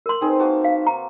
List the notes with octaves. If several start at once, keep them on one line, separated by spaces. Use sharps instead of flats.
A#4 C6
C4 D#4 G#4 B4
A#3 F#4 A5
F5
A#5